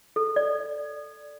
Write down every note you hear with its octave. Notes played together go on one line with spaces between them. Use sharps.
A4
D5